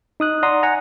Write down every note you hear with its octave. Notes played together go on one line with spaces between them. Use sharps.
D#4 D#6 F#6
D5 F#5 A#5 C6 D#6
F#5 G#5 A#5